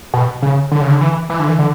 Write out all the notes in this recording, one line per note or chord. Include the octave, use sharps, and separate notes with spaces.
B2
C#3
D3
C#3
D3
E3
E3
D3
E3
D3